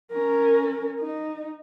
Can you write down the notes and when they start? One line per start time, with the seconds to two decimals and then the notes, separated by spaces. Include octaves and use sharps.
0.12 C#4 A#4
1.01 D#4